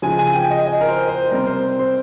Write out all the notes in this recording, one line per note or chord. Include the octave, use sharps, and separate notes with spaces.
C#3 F3 G#3 G#5
G#5
G5
D#5
D#5
A#4
C5
C5
C3 G3 A#4
C5
C5